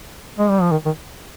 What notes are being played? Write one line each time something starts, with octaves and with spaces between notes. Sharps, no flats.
G#3
G3
F3
D#3
D#3